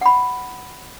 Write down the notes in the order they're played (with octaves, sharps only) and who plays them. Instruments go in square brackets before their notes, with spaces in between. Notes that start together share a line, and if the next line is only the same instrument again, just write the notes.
[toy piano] F#5 B5